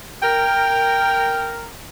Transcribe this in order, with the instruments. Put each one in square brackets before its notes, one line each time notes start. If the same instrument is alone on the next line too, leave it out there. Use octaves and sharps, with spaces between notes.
[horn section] A#4 [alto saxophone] G5